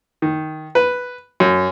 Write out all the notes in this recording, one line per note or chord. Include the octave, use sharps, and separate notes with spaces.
D#3
B4
F#2